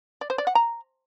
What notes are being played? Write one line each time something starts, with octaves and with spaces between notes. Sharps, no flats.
D5
C5
D5
F#5
A#5